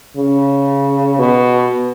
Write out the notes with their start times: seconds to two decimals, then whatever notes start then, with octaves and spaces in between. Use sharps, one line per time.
0.17 C#3
1.19 B2